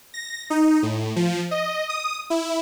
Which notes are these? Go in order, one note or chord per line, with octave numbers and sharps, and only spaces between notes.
A#6
D#4
A2
F3
D#5
D#6
E4